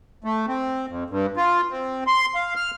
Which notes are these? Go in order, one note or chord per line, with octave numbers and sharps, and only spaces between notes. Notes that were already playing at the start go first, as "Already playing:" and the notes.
A3
C4
F2
G2
F4
C4
C6
F5
F6